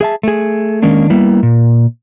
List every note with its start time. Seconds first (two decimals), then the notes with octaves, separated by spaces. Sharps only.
0.01 G#4 E5 A5
0.23 A3 G#4
0.83 D#3 G#3 A#3 C#4 D4
1.10 G3 A#3 B3 E4
1.43 A#2